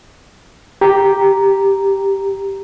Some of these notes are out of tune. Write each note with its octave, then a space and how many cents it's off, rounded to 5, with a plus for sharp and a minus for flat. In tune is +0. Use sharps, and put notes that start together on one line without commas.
G4 +0 A#5 +0